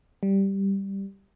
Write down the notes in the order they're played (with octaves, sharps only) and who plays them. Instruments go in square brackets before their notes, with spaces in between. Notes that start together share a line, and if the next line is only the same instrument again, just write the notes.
[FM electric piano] G3